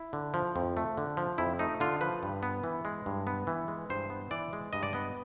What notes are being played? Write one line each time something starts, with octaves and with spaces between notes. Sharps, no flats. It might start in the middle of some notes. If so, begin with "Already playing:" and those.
Already playing: E4
D3
F3
F2
A3
D3
F3
F2 E4
A3 D#4
D3 F4
F3 B4
G2
B3
E3
G#3
G2
B3
E3
G#3
G2 C5
B3
E3 D5
G#3
G2 D#5
D5
B3 D#5